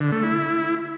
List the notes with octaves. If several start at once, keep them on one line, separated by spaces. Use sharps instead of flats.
D3
A3
E4